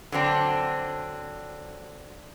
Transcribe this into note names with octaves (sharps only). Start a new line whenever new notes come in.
D3 F#3 C4 D4